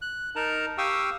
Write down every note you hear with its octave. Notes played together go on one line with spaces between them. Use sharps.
F#6
D#4 A#4 A5 A#5
G4 F5 G5 C#6 D#6 E6